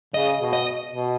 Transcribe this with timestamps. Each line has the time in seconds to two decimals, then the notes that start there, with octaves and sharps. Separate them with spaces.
0.14 C#3 D#5
0.40 B2
0.53 D#5
0.91 B2